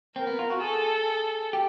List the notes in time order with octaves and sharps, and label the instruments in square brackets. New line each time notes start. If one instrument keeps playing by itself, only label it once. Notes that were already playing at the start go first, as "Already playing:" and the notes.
[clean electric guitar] C4 [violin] A#4
[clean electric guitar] B3
F4
F#4
[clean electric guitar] G#4 [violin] A4
[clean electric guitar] G4